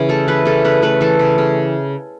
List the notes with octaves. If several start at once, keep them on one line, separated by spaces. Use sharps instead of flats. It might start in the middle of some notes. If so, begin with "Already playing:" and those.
Already playing: C#3 E3
A3 A4
E3 B4
C#3 A4
C#3 B4
A3 B4
E3 A4
C#3
C#3